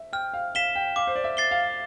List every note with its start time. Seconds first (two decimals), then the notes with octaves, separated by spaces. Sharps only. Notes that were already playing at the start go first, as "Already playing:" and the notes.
Already playing: E5
0.13 G5 F6
0.33 F5
0.55 F5 B6 E7 G7
0.75 G5
0.96 F5 D6
1.07 C5
1.16 D5
1.24 E5
1.37 A6 C7 G7
1.51 F5